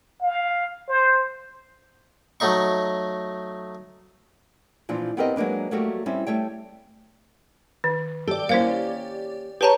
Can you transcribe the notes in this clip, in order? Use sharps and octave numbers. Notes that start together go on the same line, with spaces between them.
F5
C5
F#3 A3 D#4 C#6
A#2 E3 F3 D4
B3 C4 G4 A#4 B4 D#5
F#3 G#3 A#3 D4 B4
F#3 G3 A3 A#3 F#4 G4
G3 C4 C#4 E4
G3 A3 C#5 G5
D#3
G4 A4 D5
A#3 C#4 E4 C5 F5
G4 G#4 B4 C#5 A5 A#5